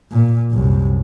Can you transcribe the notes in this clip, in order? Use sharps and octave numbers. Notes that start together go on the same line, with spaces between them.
A#2
C2 F#2